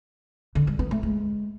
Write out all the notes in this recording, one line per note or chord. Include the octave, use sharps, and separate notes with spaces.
D3
G3
B3
A3
G#3